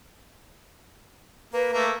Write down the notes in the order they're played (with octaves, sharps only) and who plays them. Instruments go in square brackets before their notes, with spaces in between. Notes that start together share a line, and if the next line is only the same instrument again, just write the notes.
[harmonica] A#3 [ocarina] B4
[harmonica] A3 A#3